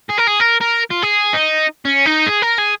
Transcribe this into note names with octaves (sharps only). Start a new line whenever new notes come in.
G#4
A#4
G#4
A#4
A#4
F4
G#4
D#4
C#4
D#4
G#4
A#4
G#4